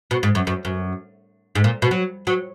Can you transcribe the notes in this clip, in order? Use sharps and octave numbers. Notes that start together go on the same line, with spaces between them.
B2
G#2
F#2
F#2
F#2
G#2
A#2
B2
F#3
F#3